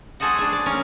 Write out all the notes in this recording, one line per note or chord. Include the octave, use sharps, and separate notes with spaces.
F#4 G#4 A4 C5 D#5 F#5
D4 G#4
D5
C#4 A#4